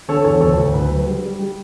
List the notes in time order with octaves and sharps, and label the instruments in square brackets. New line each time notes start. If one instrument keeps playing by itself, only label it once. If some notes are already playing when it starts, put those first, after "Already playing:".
[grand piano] D3 A4 C#5
E2 A4 C#5
D2 A4 C#5
D2
D2 B4
F#3
G3
G3
G3